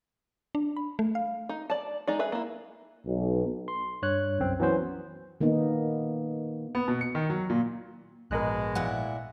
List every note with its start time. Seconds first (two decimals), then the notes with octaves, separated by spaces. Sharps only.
0.55 D4
0.76 B5
0.99 A3
1.15 F5
1.49 D#4
1.70 D5 A5
2.08 G#3 D#4 D5
2.19 G#4 B4 E5
2.32 A#3 E4
3.06 B1
3.68 C6
4.02 G2 C#5 F#6
4.39 C2 F#2 C4
4.60 E3 F#3 B3 C#4 C5
5.41 D#3 A#3 B3 D#4
6.75 B3
6.88 B2
7.01 C#7
7.15 D#3
7.30 F#3
7.50 A#2
8.31 A#1 G#2 B2 G#3 A#4 D#5 F#6
8.75 A#2 E4 F#5